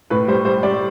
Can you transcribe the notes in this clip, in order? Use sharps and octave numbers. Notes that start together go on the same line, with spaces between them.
A2 B4
G3 C5
G3 C5
G3 D5